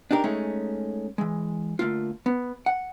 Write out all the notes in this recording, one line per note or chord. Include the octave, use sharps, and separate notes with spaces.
D4 D#4 G4 A#4
G#3 A3 C#4 D#4
E3 G#3
D3 A3 A#3 F4
B3
F#5